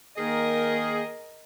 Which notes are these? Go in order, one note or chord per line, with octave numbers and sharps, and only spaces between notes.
D#3 A#3 G#4 A#4 D#5